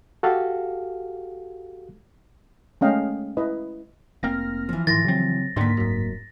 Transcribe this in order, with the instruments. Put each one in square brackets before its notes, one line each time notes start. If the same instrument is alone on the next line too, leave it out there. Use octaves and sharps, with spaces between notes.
[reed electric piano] F#4 G4 A4 F5
[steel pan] G#3 A3 C#4 D#5 F5 G5
E4 B4 D#5
[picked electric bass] F1 A#3 C4 [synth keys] F6 A#6
[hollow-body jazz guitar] E3 F3
[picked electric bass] G#2 D#3 [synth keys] E4 C6 [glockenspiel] A6 A#6
[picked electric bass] C#3 C4 [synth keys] F#3
[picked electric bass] D#2 D3 D#3 [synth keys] G#2 B6 [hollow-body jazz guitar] A#3 C6
[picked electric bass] D1 F#2